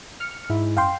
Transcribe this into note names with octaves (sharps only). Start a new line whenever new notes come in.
F6 C#7
G#2 E4
F#2 F5 G5 C6